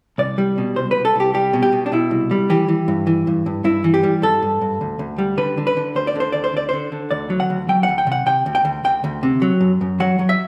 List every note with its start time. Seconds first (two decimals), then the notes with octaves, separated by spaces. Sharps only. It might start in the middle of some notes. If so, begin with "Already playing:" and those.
0.18 C2 D5
0.38 G3
0.58 B2
0.76 C2 C5
0.91 C2 B4
1.05 A4
1.16 C2 G4
1.34 G3 G4
1.53 B2
1.62 G4
1.72 B2
1.86 D4
1.92 B2 E4
2.11 C2
2.31 G3
2.50 E3 G4
2.68 E3
2.88 G2
3.07 E3
3.27 G2
3.46 G2
3.64 G2 E4
3.84 E3
3.94 G4
4.03 G3
4.22 G2 A4
4.43 G2
4.61 G2
4.81 D2
4.99 D2
5.18 G3
5.38 D3 B4
5.58 D3
5.67 B4
5.77 D3
5.95 D2 C5
6.07 D5
6.15 D3 C5
6.32 D2 D5
6.44 C5
6.53 D3 D5
6.69 D3 C5
6.92 D3
7.11 D2 D5
7.30 F#3
7.40 F#5
7.50 D2
7.69 F#3 G5
7.83 D2 F#5
7.98 G5
8.07 C3 F#5
8.26 C3 G5
8.46 D2
8.55 G5
8.65 D2
8.84 D2 G5
9.04 D2
9.23 C3
9.42 F#3
9.61 F#2
9.81 F#2
10.00 F#3 F#5
10.19 F#3
10.29 E5